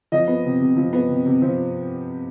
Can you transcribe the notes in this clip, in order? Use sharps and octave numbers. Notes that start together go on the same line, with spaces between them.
F3 D#5
B3
C3
C3
F3
B3
C3
C3
F3 C5